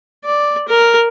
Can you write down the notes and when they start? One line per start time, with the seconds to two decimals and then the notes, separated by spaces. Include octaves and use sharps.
0.25 D5
0.68 A#4